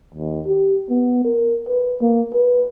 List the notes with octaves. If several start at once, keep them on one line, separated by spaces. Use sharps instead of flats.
D#2
G4
B3
A#4
B4
A#3
B4